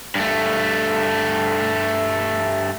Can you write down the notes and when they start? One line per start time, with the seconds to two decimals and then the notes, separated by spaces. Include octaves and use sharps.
0.15 G2 A3